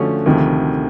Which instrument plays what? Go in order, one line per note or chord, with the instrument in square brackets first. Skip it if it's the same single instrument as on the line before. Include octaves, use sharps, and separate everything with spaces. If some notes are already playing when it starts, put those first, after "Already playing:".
Already playing: [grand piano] D3 F3 A3 C#4 F#4
[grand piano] D2 C3 F3 A3 [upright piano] D#3